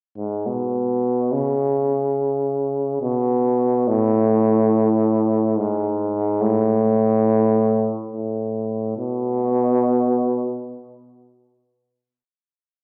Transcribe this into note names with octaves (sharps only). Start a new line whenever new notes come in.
G#2
B2
C#3
B2
A2
G#2
A2
A2
B2